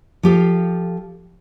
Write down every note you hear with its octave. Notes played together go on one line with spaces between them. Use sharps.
F3 G4 A4 F5